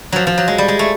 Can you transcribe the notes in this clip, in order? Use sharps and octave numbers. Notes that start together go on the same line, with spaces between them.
F3 F#3
F3
F#3
G#3
G3
G#3
A3